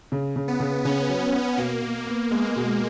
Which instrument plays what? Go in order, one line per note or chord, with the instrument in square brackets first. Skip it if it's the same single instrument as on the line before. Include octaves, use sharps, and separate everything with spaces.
[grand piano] C#3
C#3
[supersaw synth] B3
[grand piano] C#3
[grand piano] C#3 [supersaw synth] C#4
[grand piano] F#3
B3
[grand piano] B2 [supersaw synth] A#3
[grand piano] B2
B3
[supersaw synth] G#3 [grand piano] B3
[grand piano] B2